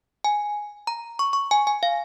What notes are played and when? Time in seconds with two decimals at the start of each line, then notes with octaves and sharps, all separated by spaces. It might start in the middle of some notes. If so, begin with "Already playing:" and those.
0.24 G#5
0.87 A#5
1.19 C#6
1.33 C#6
1.51 G#5
1.67 G#5
1.83 F5